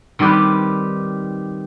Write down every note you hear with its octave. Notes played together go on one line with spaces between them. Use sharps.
D#3 G3 C4 G4 B4